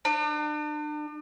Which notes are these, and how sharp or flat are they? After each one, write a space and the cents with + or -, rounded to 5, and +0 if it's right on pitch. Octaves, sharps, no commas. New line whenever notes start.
D4 +40